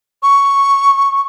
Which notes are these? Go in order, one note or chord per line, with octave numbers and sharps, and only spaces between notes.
C#6